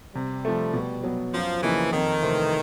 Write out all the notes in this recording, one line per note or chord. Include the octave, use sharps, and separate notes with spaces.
C3 G3
F3 A3
B2
F#3 B3
F#2 F3
C#3 E3 F3 A#3 D#4
F2 D#3
C3 E3 A3 C4